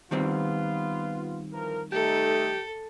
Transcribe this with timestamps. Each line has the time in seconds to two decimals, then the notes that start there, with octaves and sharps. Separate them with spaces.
0.11 D#3 G3 B3 C4 F4
1.51 E3 F3 A#4
1.92 A3 D#4 G4 A4